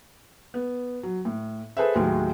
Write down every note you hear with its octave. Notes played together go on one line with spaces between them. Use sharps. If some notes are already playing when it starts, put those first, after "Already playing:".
B3
F#3
A2
G#4 A4 B4 C5 E5
D#2 A2 F#3 G#3